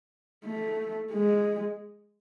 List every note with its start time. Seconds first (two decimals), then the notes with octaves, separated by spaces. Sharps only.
0.45 A3
1.12 G#3